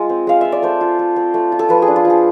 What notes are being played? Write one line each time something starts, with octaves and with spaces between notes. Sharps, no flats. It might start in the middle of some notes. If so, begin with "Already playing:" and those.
Already playing: G#3 F4
C4
G#3 F5
F4 E5
D5
A3 C5
F4
A3
C4
A3
F4
A4
F3 B4
G#4
D4
F4
F3
G#4